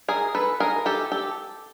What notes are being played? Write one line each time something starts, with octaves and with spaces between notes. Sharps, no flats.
G#4 A#4
A4 B4
G#4 A#4
G4 A4
G4 A4